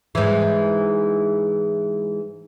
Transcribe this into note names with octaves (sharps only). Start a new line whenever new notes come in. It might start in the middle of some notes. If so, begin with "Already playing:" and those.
G#2 E3